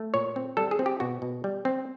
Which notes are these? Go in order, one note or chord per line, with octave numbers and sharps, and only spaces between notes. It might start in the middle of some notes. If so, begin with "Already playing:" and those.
Already playing: A3
A#2 C#5
C4
G3 A4
G#4
C4
G4
B2 F#4
B2
G3
C4